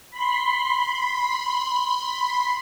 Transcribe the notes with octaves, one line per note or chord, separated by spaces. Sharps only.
B5 C6